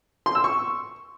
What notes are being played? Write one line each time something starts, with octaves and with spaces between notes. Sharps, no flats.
C6
E6
C#6